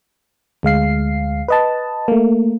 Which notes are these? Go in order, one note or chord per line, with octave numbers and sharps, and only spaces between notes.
D2 G#3 F5 C7
B4 D#5 A5
A3 A#3